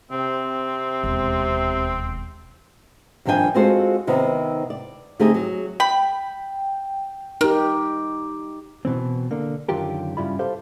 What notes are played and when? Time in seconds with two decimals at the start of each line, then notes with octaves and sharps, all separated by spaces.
0.11 C3 C4
1.04 E1 D#2
3.25 G2 D#3 F3 D4 G5 G#5
3.54 G#3 C4 F4 F#4 A4 C5
4.07 C3 D#3 B3 C4
4.70 D5
5.20 D3 A3 C4 D#4 G4 G#4
5.34 F#3
5.80 G5 B5
7.41 D#4 G4 A#4
8.85 B2 E3 C4
9.31 D3 A#3
9.68 F#2 D3 D#3 F4 G4 A#4
10.17 G2 C#3 E4 F4 B5
10.39 G4 A4 C5 F5